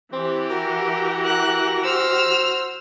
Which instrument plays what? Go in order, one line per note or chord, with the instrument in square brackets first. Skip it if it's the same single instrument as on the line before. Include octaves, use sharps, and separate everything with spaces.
[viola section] E3 G4 [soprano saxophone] C4
[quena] F#4 [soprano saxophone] A#4
[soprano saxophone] A#4 [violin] F#6
[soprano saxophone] C5 [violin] E6 F6